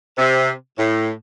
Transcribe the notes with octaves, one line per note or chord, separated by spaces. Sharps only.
C3
A2